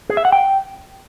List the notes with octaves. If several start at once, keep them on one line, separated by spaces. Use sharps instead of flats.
G#4
E5
F#5
G5